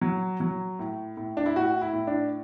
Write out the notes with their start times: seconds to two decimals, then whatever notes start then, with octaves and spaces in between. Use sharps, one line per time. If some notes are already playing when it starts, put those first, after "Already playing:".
0.02 F#3
0.40 F#3
0.79 A2
1.17 A2
1.37 D4
1.46 E4
1.56 A2 F#4
1.81 E4
1.93 A2
2.07 D4